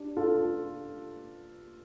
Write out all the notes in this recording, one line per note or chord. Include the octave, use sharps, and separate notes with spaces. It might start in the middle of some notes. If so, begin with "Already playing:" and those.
Already playing: D4 G4
F4 A4